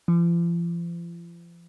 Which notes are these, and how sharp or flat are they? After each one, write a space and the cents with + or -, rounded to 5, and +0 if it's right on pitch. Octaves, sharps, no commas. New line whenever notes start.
F3 -40